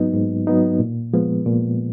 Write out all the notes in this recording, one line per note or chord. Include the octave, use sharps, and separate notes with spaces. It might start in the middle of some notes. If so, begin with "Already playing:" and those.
Already playing: G#2 F#3 B3 D#4
G#2
F#3 B3 D#4
A#2
F3 G#3 B3
A#2